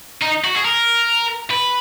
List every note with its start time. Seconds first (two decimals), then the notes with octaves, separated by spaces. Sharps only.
0.22 D#4
0.44 F#4
0.55 G#4
0.65 A#4
1.51 B4